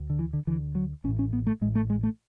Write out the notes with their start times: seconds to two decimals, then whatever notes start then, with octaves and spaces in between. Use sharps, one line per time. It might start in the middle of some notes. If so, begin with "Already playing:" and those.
Already playing: D2
0.10 D3
0.19 E3
0.33 D3
0.47 D2 D3 E3
0.75 F#3
1.04 A1 C#4
1.08 A2
1.19 C#4
1.33 B3
1.47 A3
1.61 A2 G#3
1.65 A1
1.75 A3
1.90 G#3
2.03 A3